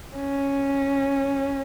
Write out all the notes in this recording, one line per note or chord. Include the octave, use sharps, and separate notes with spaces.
C#4